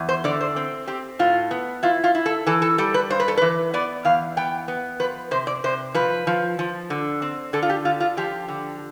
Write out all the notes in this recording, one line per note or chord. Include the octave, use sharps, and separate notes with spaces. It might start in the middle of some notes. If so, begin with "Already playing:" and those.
Already playing: E2
C5
D3 D5
C5
C4
C4 G4
A2 F4
B3
E4 F4
F4
E4
A4
E3 A4
A4
G3 A4
B4
G2 C5
B4
A4
E3 B4
B3 D5
E2 F5
B3 G5
B3
F3 B4
C3 C5
D5
C3 C5
F3 B4
F3
F3
D3
C4
D3 A4
F4
G4
D3 F4
F4
F3 G4
D3